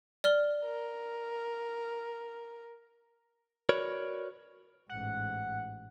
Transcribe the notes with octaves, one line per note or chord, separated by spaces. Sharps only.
D5 F6 G7
A#4
F#4 A#4 B4 C#5 D5
A1 G#2 F#5